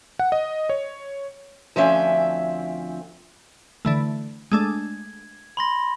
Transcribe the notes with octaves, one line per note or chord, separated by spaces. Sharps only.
F#5
D#5
C#5
D2 F3 C4 C#4 E5
D3 E3 A3
G#3 A3 D4 G#6
B5 C6 A#6